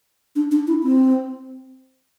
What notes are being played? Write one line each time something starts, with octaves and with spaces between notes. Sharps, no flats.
D4
D4
E4
C4